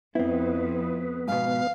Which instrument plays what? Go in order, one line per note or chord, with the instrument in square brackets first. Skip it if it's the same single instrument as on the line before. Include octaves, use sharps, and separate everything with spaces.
[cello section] F2 [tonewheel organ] B3 [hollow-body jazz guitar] C4 E4
[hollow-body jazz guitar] G#2 B2 [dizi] F5